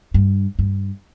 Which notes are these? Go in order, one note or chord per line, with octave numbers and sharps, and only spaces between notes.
G2
G2